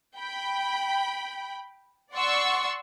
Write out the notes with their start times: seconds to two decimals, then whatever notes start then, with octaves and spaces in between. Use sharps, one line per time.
0.17 G5 B5
2.13 D5 F#5 C6 C#6 E6